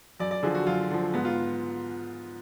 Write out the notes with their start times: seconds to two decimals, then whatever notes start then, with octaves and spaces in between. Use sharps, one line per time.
0.20 F#2 D5
0.31 D5
0.43 D3 F3 G#4
0.55 F#4
0.67 F#2 F4
0.90 D3 F3
1.14 G#2 B3
1.25 F4